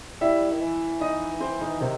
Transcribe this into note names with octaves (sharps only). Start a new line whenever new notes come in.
G3 E4 E5
D#3
E3
D#4 D#5
C4 C5
D#3 D#4
C3 D#3 C4